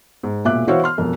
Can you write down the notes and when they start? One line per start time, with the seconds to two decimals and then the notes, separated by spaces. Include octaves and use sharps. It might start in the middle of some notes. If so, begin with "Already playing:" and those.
0.23 G#2
0.45 E1 A#2 E5 D6 F#6
0.67 E3 F#4 C5 C#5 F5 E6
0.84 C6 F6
0.98 E1 F2 A#4